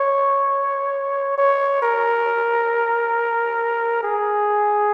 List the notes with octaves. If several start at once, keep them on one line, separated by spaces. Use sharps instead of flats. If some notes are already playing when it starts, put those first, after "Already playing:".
Already playing: C#5
C#5
A#4
G#4